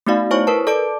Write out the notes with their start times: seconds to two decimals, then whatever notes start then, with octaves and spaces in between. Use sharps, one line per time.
0.06 A3 B3 D#4 F#4 D5 F5
0.31 E4 C5 C#5 G#5 C#6
0.47 A#4 B4 A5
0.67 A4 D5 A5 D6 D7